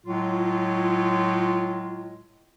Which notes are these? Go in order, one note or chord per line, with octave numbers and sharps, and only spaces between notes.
A2 F#3 G#3 F4